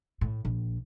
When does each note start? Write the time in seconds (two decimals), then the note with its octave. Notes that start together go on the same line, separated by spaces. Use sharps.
0.21 A2
0.45 A#1